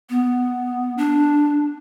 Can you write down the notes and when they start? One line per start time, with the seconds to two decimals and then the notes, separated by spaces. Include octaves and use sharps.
0.10 B3
0.98 D4